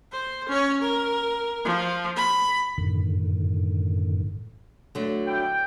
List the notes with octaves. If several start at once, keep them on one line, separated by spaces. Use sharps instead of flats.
C5
C#4 C#5
A#4
F3
B5
F#2 A2 D3 D#3
D3 F#3 A3
G3 E4 G5